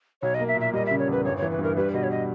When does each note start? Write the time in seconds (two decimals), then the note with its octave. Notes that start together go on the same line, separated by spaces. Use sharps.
0.22 B1 C#5
0.34 D#5
0.39 A#3
0.48 E5
0.56 A#2
0.61 E5
0.73 G3 D#5
0.86 E5
0.91 C#3
0.99 C#5
1.08 E2 B4
1.25 G1 C#5
1.38 C#5
1.42 E3
1.51 B4
1.59 G2 A#4
1.77 G3 B4
1.93 B2 D#5
2.03 C#5
2.11 D#5